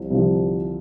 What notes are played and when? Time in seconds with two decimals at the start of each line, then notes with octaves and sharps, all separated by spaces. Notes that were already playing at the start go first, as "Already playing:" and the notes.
Already playing: C2 C3 F3
0.10 C2 C3 F3